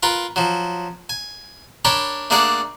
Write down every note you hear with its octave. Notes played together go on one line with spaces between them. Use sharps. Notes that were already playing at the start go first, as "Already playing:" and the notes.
F4 A#4 B4
F3 F#3
G#5
D4 A#4 C#5 G5 A5 B5
A3 A#3 D4 G#4 D5 F#5